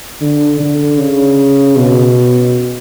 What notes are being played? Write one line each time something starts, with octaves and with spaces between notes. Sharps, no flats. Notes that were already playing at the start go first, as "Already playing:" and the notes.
D3
D3
C#3
B2